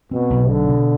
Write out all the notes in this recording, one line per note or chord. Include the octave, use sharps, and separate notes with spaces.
B2 C4
B1
B2 D3
B2